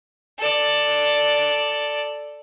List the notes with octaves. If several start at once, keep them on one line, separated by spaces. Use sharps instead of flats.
A4 D5